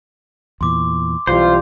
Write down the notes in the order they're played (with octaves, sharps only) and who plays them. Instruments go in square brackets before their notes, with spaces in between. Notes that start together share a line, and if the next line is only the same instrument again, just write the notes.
[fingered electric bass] E2 A#2 E3 [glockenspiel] C6 D6
[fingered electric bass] B1 E3 [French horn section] C3 G3 F4 [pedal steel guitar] C5